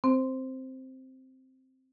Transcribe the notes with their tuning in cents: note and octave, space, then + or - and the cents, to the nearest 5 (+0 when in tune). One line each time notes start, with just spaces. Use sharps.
C4 +0 C5 +0